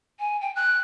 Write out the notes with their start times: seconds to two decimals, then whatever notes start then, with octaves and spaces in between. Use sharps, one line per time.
0.20 G#5
0.41 G5
0.56 F#6